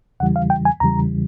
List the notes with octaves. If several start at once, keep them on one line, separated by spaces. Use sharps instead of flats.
E2 C#3 E3 G3 F#5
F5
G5
G#5
E2 C#3 E3 G3 A#5